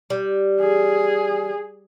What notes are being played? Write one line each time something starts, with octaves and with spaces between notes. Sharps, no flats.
G3
G#4